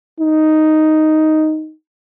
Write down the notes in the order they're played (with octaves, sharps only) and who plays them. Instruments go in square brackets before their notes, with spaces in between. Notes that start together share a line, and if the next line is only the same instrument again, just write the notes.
[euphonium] D#4